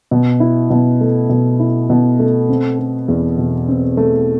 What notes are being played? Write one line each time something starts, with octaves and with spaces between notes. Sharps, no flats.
B2
E4
B2
A3
B2
E4
B2
A3
C4
A3
E2
B2
C4
A3